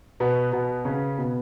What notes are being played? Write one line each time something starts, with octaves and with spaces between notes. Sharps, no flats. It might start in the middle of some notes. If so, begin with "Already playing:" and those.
B2 B3
B2 B3
C#3 C#4
B2 B3